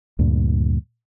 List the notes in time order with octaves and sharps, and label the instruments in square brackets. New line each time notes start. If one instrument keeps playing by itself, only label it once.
[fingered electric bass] D2 G2 A#2